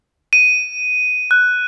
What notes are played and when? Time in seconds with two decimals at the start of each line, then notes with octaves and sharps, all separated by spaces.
0.33 D#7
1.31 F#6